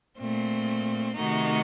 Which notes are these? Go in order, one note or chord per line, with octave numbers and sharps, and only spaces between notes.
A#2 A3 C4
C3 D#3 A3 D#4 F#4